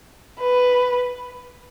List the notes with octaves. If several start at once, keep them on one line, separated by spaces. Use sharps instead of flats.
B4